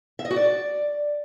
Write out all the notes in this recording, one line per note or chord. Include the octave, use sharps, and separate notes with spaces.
E5
D#5
F#4
D5